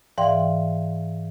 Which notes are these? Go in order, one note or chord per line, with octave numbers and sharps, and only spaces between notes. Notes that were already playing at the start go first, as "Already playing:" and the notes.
G#2 E3 D5 F5 G5 C6